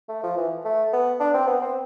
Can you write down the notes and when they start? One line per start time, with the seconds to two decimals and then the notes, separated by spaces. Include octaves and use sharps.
0.09 A3
0.23 F3
0.37 E3
0.65 A3
0.93 B3
1.20 D4
1.34 C4
1.47 B3
1.61 C4